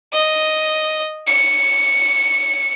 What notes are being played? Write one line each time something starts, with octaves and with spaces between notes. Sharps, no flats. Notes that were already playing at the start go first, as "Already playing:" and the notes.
D#5
C#7